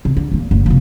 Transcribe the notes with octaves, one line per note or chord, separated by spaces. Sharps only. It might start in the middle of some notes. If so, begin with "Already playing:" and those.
C3
D3
E2 A#2
F#1
C3 F3